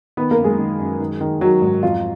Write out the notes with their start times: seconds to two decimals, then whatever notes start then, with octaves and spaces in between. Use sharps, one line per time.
0.17 D#3 B3 B4
0.31 A#3 A#4
0.38 F#2
0.44 G#3 G#4
0.58 D#3
0.79 F#2
1.00 D#3
1.21 D#3
1.41 D#3 F#3 F#4
1.62 G#2
1.83 F2 F4